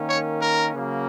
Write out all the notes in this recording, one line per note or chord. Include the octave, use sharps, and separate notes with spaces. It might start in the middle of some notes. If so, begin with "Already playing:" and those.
Already playing: D#3 A#3 C#4
C#5
A#4
C#3 F#3 A#3